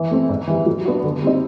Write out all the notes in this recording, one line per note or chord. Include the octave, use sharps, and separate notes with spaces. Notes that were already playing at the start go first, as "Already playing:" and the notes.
Already playing: E3
A3 C4
G#2
E3 G3
F#3
B3 D4 F#4
D3
G3 C4 D#4